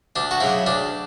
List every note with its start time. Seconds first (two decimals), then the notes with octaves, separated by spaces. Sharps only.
0.16 D2 D4
0.31 F#4
0.40 C#3 F#3 E4
0.66 D2 D4